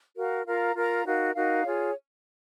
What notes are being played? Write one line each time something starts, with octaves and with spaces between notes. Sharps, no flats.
F#4 A#4 F5
F4 A#4 F5 A#5
F4 A#4 F5 A#5
D#4 F#4 A#4 F5
D#4 F#4 A#4 F5
F4 G#4 C#5